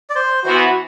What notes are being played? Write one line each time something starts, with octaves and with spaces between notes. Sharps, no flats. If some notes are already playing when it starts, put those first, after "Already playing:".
D5
C5
E3 B3 F#4 C5